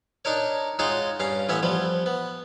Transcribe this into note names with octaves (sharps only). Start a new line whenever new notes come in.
D4 D#4 A#4 C#5
G#3 D#4 F4 F#4 C#5 D#5
G2 C#4 F5
A1 B3 C#4 C#5 E5
F3 G3 B3
B3